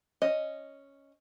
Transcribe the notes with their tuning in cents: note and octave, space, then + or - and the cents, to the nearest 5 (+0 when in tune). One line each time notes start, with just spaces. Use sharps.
C#4 +0 D#5 +0